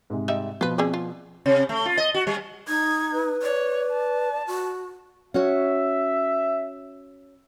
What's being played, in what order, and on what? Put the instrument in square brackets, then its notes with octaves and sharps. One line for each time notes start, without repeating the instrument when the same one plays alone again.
[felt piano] G#2 C3 G#3
[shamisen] G3 D#4 E5
[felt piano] B2 F3 [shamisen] F4 B4
[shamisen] C4 G#4 D5
F4
[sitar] C3
A3
F4
D#5
F#4
G3
[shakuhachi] D#4 [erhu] G#6
[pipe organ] B4
[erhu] C#5 [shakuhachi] D5
[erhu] A5
[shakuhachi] F#4
[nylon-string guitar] C#4 F#4 C#5 [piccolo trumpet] E5